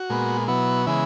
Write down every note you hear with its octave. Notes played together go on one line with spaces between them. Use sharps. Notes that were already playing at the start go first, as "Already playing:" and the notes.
Already playing: F#4
A#2 G#3 B3
B2 F#3 B3 E4
C#3 E3 G#3 B3 E4